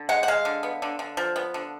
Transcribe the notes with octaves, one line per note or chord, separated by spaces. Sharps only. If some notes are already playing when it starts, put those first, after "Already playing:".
Already playing: D3
G#3 F#5
F#5
G#3 F5
D3
B3
D3
D3
F3
B3
D3